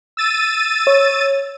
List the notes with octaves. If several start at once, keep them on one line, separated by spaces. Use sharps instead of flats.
E6 A6 D#7
C#5